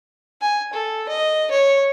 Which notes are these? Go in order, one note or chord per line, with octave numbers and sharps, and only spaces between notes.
G#5
A4
D#5
C#5